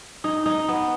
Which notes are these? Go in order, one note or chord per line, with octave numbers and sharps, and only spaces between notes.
D#4
D#4
B3